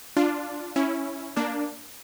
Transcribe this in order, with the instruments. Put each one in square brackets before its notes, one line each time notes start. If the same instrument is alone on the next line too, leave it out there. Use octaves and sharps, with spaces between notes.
[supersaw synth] D4 F4
C#4 E4
A#3 D4